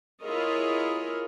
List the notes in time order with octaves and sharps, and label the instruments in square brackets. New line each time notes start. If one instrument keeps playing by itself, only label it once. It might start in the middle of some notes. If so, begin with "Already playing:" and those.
[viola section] E4 F4 G#4 A#4 C#5 D#5